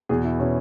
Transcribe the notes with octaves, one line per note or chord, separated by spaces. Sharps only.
E2 B2 G#4
E4
B2 C#4